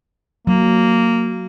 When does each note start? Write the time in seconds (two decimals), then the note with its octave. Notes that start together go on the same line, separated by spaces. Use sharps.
0.47 F#3 A#3